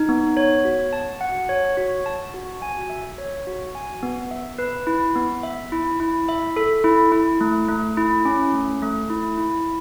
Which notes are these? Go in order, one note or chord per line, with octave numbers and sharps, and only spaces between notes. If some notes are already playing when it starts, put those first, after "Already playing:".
Already playing: D#4
B3
C#5
F#4
A5
F#5
C#5
F#4
A5
F#4
G#5
E5
C#5
F#4
G#5
B3
E5
B4
E4
B3
E5
E4
E4
E5
A4
E4
E4
A3
A3
E4
C#4
A3
A3
E4
E4